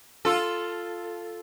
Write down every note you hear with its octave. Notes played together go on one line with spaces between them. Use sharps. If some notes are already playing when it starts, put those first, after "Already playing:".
F4 A4